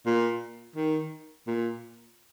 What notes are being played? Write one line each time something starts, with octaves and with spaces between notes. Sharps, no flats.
A#2
D#3
A#2